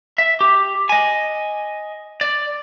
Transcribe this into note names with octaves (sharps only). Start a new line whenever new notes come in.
E5
G4
D#5 G#5
D5